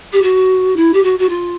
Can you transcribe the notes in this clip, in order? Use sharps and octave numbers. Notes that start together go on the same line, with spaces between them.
G4
F#4
E4
G4
F#4
F#4
F4